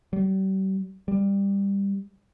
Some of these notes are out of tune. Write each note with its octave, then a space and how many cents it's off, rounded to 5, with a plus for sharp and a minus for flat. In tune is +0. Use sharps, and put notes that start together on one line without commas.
G3 -40
G3 +15